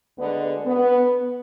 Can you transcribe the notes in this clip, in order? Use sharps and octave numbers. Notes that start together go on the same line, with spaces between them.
D2 D3 G#3 B3
B3